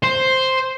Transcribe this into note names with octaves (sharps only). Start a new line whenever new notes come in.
C5